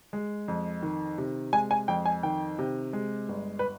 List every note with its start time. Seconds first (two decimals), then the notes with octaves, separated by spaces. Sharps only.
0.13 G#3
0.48 F2
0.83 D#3
1.18 C3
1.53 G#3 G#5
1.71 G#5
1.88 F2 G5
2.06 G#5
2.23 D#3 G5
2.59 C3
2.93 G#3
3.29 G1
3.59 B4